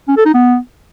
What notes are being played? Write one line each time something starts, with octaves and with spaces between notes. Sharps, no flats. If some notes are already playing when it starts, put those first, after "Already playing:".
C#4
A4
D#4
B3